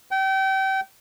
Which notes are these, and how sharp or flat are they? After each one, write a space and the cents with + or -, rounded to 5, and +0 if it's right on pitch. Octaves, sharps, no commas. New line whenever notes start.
G5 -30